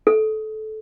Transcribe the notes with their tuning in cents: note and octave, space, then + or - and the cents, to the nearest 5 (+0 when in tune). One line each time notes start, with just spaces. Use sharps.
A4 -20